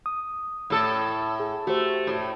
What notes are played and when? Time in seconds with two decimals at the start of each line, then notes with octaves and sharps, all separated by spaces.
0.06 D#6
0.70 A2 A4
1.40 G#4
1.67 A3 F#4 G4 C5
2.07 A2